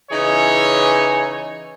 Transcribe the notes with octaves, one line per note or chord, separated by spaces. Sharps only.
C#3 E3 D#4 G#4 C#5